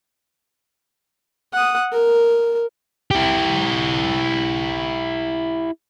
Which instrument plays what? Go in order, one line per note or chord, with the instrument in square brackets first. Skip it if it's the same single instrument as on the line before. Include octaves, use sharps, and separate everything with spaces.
[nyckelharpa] F#5 D#6
A#4
[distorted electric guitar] E4 G4